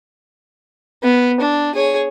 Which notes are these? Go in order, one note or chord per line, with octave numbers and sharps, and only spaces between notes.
B3
D4
G#4 C#5